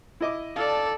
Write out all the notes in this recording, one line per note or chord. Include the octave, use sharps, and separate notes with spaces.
E4 D#5 D6
D4 A4 D5 F5